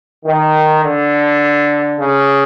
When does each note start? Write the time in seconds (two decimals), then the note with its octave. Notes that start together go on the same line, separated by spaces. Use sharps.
0.24 D#3
0.82 D3
1.97 C#3